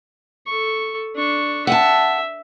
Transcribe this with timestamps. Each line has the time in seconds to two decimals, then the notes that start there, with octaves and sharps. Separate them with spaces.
0.47 A4 C#6
1.15 D4 C#6
1.67 E5 F#5 G5 A5